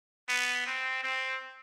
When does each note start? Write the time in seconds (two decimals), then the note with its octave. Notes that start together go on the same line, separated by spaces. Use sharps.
0.29 B3
0.67 C4
1.04 C4